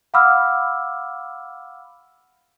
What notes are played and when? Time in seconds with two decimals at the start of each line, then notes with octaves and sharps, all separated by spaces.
0.14 F5 F#5 B5 D6 E6 F6